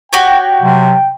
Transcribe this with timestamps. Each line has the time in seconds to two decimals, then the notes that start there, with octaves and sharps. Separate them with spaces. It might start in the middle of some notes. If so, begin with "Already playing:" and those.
0.13 F#4 G4 C#5 G5
0.62 C3 F#3